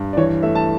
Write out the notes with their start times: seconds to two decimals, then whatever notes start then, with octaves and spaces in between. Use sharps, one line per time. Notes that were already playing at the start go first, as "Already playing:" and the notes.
Already playing: G2
0.13 D5
0.17 E3 C#5
0.42 A3 E5
0.55 A5